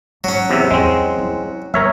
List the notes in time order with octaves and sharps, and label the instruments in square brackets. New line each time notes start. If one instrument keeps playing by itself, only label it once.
[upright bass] G#1 [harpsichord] F#3 C#4
[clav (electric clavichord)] E2 C3 E5
[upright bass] E2 [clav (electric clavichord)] G#3 C4
[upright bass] E4
[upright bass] G1 [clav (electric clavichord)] A#4 C#5 E5